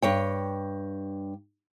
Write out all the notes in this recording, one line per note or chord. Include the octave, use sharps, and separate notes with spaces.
G2 C#5 G5